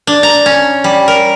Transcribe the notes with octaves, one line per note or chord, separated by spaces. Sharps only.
D4
A#5
C#4
G3
A#4